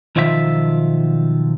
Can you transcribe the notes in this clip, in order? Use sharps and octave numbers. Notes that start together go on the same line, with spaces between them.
B1 D#3 F3 F4 G4 E5